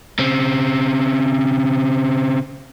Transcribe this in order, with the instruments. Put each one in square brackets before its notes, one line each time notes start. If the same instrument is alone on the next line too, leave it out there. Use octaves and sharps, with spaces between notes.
[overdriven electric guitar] C#3 C4